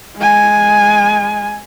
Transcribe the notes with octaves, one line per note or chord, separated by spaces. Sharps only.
G#3 G#5